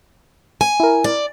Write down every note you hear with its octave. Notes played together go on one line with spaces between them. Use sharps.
G#5
E4 A#4
D5